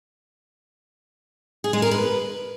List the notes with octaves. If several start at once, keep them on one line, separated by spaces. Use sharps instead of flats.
G#4
G#3
A#4
B4